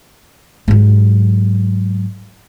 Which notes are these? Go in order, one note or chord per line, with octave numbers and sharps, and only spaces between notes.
G#2 F#3